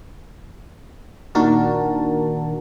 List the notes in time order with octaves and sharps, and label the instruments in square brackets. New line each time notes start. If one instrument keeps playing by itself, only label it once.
[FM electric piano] A#2 D#3 D4 F#4 A#4 A5